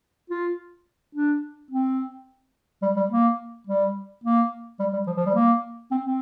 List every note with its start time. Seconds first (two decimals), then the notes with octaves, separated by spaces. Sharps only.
0.30 F4
1.15 D4
1.71 C4
2.82 G3
2.96 G3
3.11 A#3
3.67 G3
4.24 A#3
4.80 G3
4.93 G3
5.07 F3
5.17 F3
5.26 G3
5.35 A#3
5.91 C4
6.06 C4